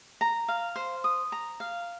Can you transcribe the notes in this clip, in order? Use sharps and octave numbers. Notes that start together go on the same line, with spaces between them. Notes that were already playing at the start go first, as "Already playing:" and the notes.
A#5
F5
C5
D#6
A#5
F5